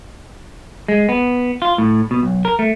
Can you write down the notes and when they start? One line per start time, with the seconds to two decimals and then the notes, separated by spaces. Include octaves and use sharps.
0.88 G#3
1.09 B3
1.62 F4
1.78 A2
2.11 B2
2.23 B1
2.45 A#4
2.59 A3